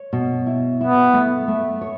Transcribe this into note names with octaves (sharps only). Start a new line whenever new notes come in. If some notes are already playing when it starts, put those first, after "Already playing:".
Already playing: C#5
B2
E4
B3 E4
A3
A3
C#5